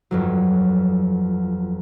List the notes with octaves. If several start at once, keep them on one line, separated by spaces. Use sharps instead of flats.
G1 F2 F#3